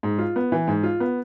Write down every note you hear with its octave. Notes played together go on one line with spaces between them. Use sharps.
G#2
F4
B3
E3
G#2
F4
B3